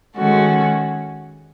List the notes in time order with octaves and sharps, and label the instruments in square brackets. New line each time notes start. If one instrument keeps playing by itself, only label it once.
[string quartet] D#3 G#3 C#4 F#4 A4